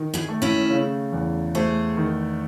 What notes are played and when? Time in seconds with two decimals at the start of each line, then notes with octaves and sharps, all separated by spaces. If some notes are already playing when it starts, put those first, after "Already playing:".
Already playing: D#3
0.14 E4 G#4
0.29 A3
0.42 C#4 E4
0.70 C#3
1.13 E2
1.55 A3 G#4 C5
1.97 D#3